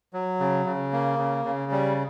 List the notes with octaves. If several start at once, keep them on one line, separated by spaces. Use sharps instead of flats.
F#3
C#3
C#3
A#3
C#3
C#3
G3